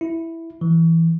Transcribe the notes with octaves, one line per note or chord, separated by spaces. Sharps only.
E4
E3